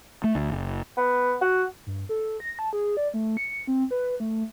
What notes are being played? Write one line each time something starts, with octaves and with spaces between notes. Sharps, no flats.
A3
D2
F#1
B3
F#4
G2
A4
A#6
A5
G#4
D5
A3
C#7
C4
B4
A3